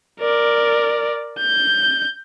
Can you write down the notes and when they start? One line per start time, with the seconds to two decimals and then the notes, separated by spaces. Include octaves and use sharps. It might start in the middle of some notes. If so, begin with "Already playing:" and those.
0.20 A#4 D5
1.40 G6